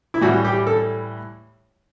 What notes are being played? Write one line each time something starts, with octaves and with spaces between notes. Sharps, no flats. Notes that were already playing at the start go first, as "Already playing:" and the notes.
E4
A2 E3 G3 F#4
G4
A4